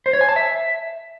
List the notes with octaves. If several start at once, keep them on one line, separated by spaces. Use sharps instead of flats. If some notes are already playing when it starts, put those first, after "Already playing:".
C5
C#5
G#5
A5
E5